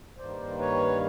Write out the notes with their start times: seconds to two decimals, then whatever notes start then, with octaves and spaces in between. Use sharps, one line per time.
0.18 G2 D#3 G3 A#3 C5 D5
0.59 B4 C#5